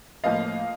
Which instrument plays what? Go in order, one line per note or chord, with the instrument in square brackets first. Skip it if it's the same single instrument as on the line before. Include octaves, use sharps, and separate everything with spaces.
[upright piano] A2 F3 A#3 D#5 F5